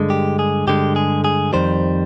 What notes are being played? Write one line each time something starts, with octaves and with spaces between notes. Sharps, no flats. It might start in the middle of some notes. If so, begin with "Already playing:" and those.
Already playing: G2 D3 G#3
G4
G#4
G2 D3 G#3 G4
G#4
G#4
F2 D#3 G3 C5